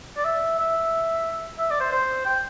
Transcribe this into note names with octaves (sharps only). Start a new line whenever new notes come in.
D5
E5
E5
E5
D5
C5
C5
G5